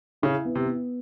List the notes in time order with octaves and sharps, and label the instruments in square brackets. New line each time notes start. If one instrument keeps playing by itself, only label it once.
[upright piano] C#3 [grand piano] E4
[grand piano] B3
[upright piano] C3
[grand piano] B3